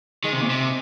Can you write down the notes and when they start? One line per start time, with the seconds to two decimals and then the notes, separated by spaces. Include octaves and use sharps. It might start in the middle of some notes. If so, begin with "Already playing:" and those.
0.24 D#3 G#3
0.33 C3
0.41 A#2
0.50 C3